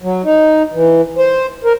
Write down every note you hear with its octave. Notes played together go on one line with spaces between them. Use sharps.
F#3
D#4
E3
C5
A#4